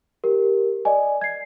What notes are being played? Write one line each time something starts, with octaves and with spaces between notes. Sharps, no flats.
G4 A#4
D5 D#5 G#5
G#6 C7